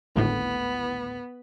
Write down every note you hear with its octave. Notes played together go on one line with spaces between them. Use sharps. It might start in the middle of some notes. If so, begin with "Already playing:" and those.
G#1 D2 A2 B3